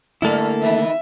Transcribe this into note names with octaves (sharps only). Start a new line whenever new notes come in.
D3 G3 A3 A#3 C#4 E4 A4
D#3 E3 B4 E5